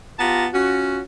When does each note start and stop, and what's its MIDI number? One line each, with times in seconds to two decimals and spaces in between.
0.19 0.47 59
0.19 0.47 65
0.19 0.47 67
0.19 0.47 81
0.19 0.47 82
0.53 1.01 61
0.53 1.01 65
0.53 1.01 66